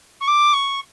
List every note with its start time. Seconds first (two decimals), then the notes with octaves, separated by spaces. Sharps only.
0.20 C#6
0.27 D6
0.53 C#6